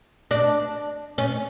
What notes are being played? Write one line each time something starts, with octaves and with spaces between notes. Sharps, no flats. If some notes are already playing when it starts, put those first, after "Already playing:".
D4
C#4